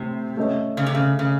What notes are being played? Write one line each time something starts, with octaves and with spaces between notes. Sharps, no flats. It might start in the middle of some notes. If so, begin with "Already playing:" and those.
Already playing: A2 C3
A3 C#4 A4 D#5
C#3
C3
C#3
C#3